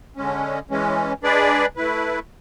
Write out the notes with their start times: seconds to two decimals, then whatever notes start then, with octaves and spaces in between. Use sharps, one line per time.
0.17 D3 G#3 C#4
0.70 E3 G#3 C#4
1.23 G#3 D4 G#4 B4 D5
1.76 A3 E4 B4